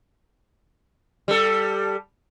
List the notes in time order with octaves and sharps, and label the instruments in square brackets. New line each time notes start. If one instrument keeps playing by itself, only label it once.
[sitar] G3 A4